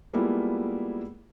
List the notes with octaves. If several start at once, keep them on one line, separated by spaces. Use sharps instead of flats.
G3 G#3 A#3 B3 E4 F4